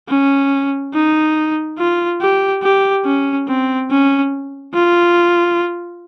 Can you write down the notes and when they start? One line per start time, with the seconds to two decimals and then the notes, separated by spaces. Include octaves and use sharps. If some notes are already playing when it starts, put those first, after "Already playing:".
0.09 C#4
0.94 D#4
1.78 F4
2.21 G4
2.63 G4
3.05 C#4
3.47 C4
3.90 C#4
4.74 F4